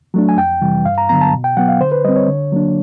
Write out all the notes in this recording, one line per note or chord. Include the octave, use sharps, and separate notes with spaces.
F#3 A3 D4
G#5
F2 G5
C3 E3 G3
G2 F5
A#5
D3 F#3 B3 A#5
A5
B2
G5
F#3 B3 F#5
F5
D3 C5
B4
G3 C4 D#5
C#5
D3
F#3 A#3 D4